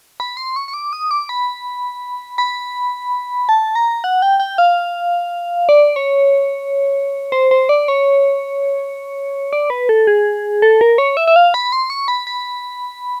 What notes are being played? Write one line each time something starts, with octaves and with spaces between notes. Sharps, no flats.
B5
C6
C#6
C#6
D6
D#6
D6
B5
B5
A5
A#5
F#5
G5
G5
F5
D5
C#5
C5
C5
D5
C#5
D5
B4
A4
G#4
A4
A#4
C#5
E5
E5
F5
B5
C6
C#6
B5
B5